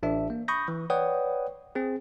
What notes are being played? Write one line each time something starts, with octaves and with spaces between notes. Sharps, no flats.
A1 D4 E5
A#3
B5 C#6 D#6 G6 A#6
E3
B4 C#5 D5 F#5 G5 D#6
C4 G#4